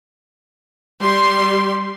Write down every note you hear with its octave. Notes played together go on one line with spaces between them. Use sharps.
G3 C6